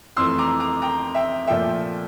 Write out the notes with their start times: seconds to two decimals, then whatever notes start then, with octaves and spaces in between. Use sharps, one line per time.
0.17 F2 E3 A3 C6 E6
0.38 A#5 D6
0.60 A#5 D6
0.82 G5 A#5
1.15 E5 G5
1.47 A#2 F3 A3 E5 G5